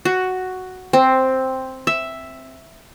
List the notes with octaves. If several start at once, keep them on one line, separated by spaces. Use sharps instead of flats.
F#4
C4
E5